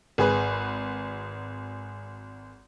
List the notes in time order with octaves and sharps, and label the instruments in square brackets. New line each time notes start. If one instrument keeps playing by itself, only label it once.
[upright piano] G#1 G#4 B4